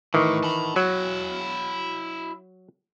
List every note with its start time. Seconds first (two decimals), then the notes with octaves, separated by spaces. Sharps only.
0.14 A2 D#3 E3
0.43 A5 B5
0.76 F#3 E4 F#4